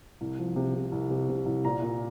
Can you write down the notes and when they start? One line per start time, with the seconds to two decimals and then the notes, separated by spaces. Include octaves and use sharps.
0.21 C2
0.39 F3
0.56 C3
0.75 C3
0.92 C2
1.10 C3
1.29 C3
1.46 C2
1.65 A#2 A#5
1.82 A#2